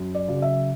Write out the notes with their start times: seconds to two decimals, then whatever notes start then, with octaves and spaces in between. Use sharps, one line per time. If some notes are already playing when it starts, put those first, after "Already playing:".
Already playing: F#2
0.15 D5
0.28 C#3 F#3
0.42 E5